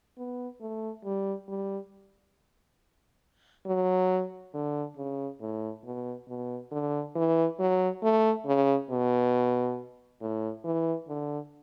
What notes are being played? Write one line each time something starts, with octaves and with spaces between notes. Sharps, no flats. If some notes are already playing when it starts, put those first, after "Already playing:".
B3
A3
G3
G3
F#3
D3
C#3
A2
B2
B2
D3
E3
F#3
A3
C#3
B2
A2
E3
D3